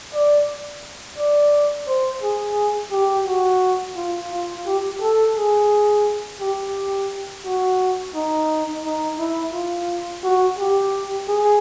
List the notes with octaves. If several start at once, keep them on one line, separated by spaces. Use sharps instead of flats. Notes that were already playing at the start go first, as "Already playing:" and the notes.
D5
D5
C5
G#4
G4
F#4
F4
F4
G4
A4
G#4
G4
F#4
D#4
D#4
E4
F4
F#4
G4
G#4